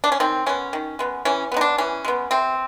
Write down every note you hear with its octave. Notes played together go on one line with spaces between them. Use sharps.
D4
C#4
D#3 C4
G#3 B3 C#4
D#3
G#3 B3
E3 C#4
G#3 B3 D#4
D4
E3 C#4
G#3 B3
C3 C4